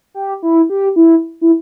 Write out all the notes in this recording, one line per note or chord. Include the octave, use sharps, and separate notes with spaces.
G4
E4
G4
E4
E4